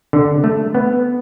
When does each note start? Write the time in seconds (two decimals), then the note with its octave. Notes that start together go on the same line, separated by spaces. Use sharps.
0.13 D3
0.44 A3
0.75 B3